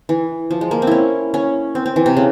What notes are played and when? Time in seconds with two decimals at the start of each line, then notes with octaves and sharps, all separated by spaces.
0.09 E3
0.51 F3
0.61 G#3
0.71 A#3
0.82 C4
0.87 C#4 E4
1.34 C#4
1.75 C4
1.86 C4
1.96 E3
2.06 C3
2.17 C#3